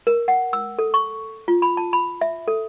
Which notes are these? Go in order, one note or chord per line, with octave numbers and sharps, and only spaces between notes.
A#4
F#5
E6
A4
C#6
F4
B5
A5
B5
E5
A4